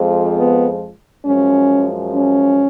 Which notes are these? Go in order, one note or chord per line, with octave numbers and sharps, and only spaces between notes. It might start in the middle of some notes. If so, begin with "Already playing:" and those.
Already playing: F2 F3 G#3
B3
F#2 F3 G#3 C#4
C#4